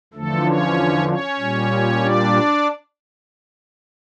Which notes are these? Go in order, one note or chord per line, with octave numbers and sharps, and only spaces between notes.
E2 D3 F3 A3 A4
C#4 C#5
C#4 C#5
A#2 G3
D4 D5